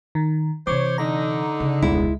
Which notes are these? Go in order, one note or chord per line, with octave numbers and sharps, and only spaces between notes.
D#3
C3 E3 C5 C#5 D6
D3 D#4 A#5
C#3
E1 C#2 G2 G#3 E4